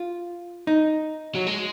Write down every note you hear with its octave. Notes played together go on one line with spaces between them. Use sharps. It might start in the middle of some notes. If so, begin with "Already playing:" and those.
Already playing: F4
D#4
F#3
G#3